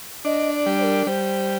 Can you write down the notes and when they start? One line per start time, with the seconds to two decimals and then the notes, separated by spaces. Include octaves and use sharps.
0.25 D4 D#5
0.53 D5
0.66 G3
0.80 C5
0.84 A#4
1.07 G3 C5